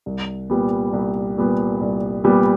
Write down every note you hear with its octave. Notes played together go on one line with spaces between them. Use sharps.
C2
A#2 G3 B3
C2
A#2 G3 B3
C2
A#2 G3 B3